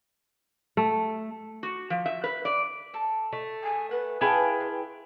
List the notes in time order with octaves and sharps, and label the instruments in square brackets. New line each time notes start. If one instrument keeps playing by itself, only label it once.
[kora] A3
[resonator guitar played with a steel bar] F#4
F3
E5
B4
D5
[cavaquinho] A4
[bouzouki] A3
[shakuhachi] G#5
[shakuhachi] B4 [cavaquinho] F#5
[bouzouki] E4 G#4 G5 [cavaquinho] C#5 F5 A5
[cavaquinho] C6